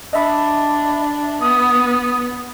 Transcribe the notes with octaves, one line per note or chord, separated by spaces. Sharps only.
D4 D#5 E5 B5
B3 D#6